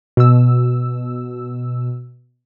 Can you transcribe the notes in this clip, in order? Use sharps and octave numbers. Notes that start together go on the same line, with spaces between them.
B2 E6